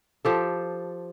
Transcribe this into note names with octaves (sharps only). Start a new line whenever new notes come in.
F3 G4 A4